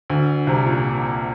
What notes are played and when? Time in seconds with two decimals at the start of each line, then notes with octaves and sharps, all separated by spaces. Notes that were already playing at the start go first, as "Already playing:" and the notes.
0.10 D2 D3
0.47 C2 C3
0.66 A#2